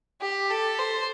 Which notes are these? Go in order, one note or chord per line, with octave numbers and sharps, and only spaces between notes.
G4
A4
C5